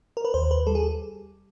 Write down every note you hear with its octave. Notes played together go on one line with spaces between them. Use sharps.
A#4
B4
D#2 C5
B4
G3 A4
G#4